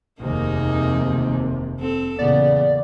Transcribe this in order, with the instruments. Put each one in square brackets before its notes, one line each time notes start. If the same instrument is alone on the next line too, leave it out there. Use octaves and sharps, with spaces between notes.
[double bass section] F1 D#2 C3 [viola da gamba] A#3 D#4 G#4
[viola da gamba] C4 A4
[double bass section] E2 A#2 C#3 [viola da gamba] B3 [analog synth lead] D5